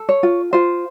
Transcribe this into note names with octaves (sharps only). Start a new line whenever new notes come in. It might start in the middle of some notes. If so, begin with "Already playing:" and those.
Already playing: A4
C#5
F4
F4 C5